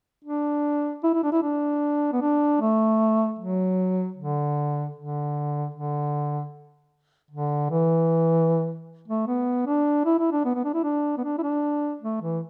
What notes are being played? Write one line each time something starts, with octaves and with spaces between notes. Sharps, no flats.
D4
E4
E4
D4
E4
D4
B3
D4
A3
F#3
D3
D3
D3
D3
E3
A3
B3
D4
E4
E4
D4
B3
B3
D4
E4
D4
B3
D4
E4
D4
A3
E3